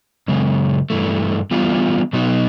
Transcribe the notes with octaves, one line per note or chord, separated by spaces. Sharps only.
F#2 C#3 G#3
G2 E3 A3
E3 G3 B3 D4 F4
B2 F#3 B3 D#4 F#4